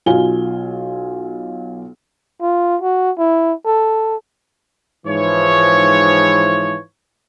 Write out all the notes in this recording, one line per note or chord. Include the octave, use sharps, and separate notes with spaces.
B1 F4 F5 G#5 G7
F4
F#4
E4
A4
G#2 E3 F3 C#5